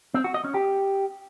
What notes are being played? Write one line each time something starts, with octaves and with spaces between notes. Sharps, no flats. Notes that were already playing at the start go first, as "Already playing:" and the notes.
C4
F#4
D#5
C#4
G4